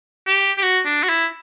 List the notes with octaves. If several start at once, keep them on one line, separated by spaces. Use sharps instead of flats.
G4
G4
F#4
D4
F#4
E4